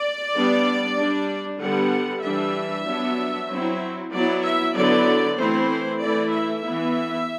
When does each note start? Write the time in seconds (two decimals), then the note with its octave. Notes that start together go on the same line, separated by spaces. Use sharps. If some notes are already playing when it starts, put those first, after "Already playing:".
Already playing: D5
0.34 G3 B3 D4
0.98 G3 D4
1.60 D3 G3 B3 F#5
2.23 E3 G3 D4 E5
2.86 F#3 B3 D4
3.49 F#3 C4 E4
4.12 F#3 B3 E4 D5
4.43 E5
4.75 D3 F#3 B3 E4 D5
5.37 E3 A3 C4 E4 C5
6.01 E3 A3 E4 D5
6.33 E5
6.64 E3 B3 E4